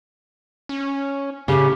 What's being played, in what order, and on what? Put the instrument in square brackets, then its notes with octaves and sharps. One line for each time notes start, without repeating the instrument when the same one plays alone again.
[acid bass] C#4
[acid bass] A2 [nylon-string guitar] C#3 [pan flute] G4